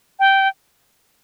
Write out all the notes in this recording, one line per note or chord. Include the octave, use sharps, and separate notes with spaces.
G5